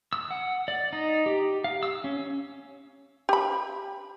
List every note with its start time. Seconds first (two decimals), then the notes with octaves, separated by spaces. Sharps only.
0.13 E6
0.31 F#5
0.68 D5
0.93 D#4
1.26 G4
1.64 F5
1.83 E6
2.04 C#4
3.29 G4 B5